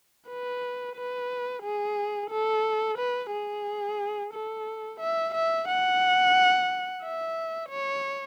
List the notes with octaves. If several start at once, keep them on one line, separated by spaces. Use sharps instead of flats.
B4
B4
G#4
A4
B4
G#4
A4
E5
E5
F#5
E5
C#5